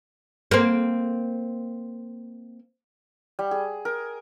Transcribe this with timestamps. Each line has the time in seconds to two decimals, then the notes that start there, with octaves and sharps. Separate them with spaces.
0.51 A#3 C4
3.39 G3
3.51 G#4
3.85 A#4